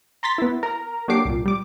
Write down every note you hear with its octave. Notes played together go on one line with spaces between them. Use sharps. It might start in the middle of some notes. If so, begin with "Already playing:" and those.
A#5 C6 A6 B6
B3 E4
A#4 A#5
F#3 A#3 D4 G4 D6 C7
C2 A#2
G3 D6